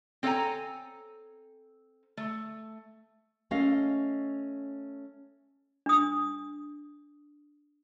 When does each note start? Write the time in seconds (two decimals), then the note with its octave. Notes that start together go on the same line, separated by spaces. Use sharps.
0.23 C4 A4 C#5 F5 G#5 A#5
2.17 A3
3.51 A3 C#4 D#5 F5
5.86 D4 D#6